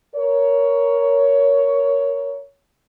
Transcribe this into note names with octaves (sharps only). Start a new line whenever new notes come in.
A#4 C#5